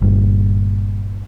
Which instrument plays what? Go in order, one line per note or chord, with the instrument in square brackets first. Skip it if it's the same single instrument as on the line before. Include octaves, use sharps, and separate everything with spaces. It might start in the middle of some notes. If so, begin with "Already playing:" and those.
[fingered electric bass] G1 G2 A#2